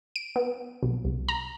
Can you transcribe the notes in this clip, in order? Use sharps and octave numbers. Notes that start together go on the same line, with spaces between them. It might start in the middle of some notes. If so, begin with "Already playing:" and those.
D7
B3
B1
C2
A#5